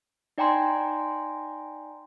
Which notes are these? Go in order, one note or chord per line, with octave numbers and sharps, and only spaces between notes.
D#4 D5 G5 G#5 A#5 C6